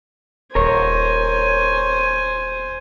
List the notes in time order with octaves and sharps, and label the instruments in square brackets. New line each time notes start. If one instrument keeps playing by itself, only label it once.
[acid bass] D#1 [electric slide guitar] A#4 C#5 [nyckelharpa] C5 G#5